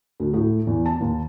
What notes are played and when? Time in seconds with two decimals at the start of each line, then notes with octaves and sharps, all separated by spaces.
0.20 D2
0.34 A2
0.67 E2
0.86 A5
1.01 D#2